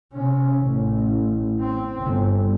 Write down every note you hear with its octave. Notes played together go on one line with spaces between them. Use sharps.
C3 C#4
A1
C4
G1